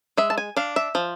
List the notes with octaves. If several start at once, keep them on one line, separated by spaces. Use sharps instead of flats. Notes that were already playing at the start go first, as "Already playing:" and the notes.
G#3 E5
A5
G#5
D4 F5
E5
F3